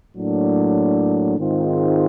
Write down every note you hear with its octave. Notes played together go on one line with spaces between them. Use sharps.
A2 F#3 A#3 D4
G#2 D#3 G#3 C4 F4